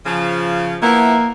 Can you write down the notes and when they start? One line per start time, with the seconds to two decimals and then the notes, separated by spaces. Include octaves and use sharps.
0.06 C#3 F3
0.82 F3 A#3 B3 E4